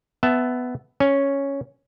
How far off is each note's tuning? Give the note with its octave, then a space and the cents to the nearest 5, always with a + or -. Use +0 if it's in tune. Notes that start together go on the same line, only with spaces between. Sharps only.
B3 +10 E5 +0 A5 +0
C#4 +0 G#5 +5